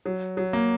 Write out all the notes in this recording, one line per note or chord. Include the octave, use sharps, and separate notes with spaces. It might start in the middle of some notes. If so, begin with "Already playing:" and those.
F#3
F#3
A#3